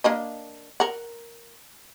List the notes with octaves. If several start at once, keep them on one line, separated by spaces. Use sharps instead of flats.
A#3 D4 D#5
A#4 F#5